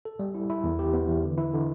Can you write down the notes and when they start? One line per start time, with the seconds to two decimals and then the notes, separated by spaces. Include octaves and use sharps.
0.05 A4
0.19 G3
0.34 E4
0.50 E4
0.64 E2
0.79 G4
0.93 B3
1.08 E3
1.23 D3
1.38 E4
1.53 D3